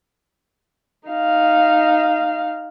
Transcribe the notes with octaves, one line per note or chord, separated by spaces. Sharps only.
D#4 F5